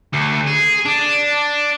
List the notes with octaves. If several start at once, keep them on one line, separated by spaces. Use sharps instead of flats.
D2
G#4
D4